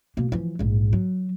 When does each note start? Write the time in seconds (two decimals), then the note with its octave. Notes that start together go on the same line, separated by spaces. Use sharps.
0.17 B2 A#3
0.32 E3 F3
0.59 A#1 G#2
0.93 F#3